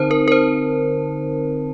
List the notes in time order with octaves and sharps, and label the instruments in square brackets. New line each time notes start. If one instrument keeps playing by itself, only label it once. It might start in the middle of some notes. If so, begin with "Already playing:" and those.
Already playing: [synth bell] D3 C4 D#4 A#4 C5 A5
A#4
A#4
C5